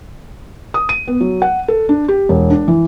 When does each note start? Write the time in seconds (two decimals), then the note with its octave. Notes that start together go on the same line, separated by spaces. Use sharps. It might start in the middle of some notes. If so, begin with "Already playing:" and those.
0.74 D#6
0.89 D#7
1.08 B3
1.21 F#3
1.42 F#5
1.68 A4
1.89 D4
2.08 G4
2.29 E1
2.50 D4
2.68 E3